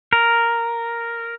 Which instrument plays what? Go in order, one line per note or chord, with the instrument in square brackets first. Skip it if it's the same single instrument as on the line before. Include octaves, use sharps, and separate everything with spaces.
[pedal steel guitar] A#4